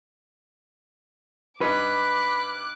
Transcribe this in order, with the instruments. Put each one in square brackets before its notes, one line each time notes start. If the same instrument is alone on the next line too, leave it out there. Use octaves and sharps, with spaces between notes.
[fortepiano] G2 D#4 [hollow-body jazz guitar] B4 [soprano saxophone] B5 [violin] D6 F#6